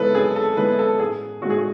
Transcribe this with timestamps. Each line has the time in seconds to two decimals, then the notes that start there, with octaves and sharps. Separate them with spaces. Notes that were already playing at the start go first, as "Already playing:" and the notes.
Already playing: F#2 E3 G#3 B3 A4 B4
0.15 F#2 G#4
0.36 A4
0.57 E3 G#3 B3 B4
0.79 A4
0.99 A1 G#4
1.42 A2 F#4
1.45 G#3 G#4
1.58 F#4